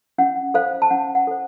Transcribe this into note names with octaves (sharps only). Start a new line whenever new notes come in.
C#4 F#5
A4 C5 F5
A5
C#4 F#5
F#5
A4 C5